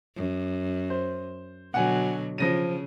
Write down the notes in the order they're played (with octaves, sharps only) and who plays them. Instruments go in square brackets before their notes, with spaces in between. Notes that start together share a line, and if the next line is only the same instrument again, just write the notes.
[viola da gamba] F#2
[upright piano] C5
[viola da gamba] B2 D3 F#3 [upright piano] F#5 G#5
[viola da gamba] C#3 [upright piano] F3 A#6 D#7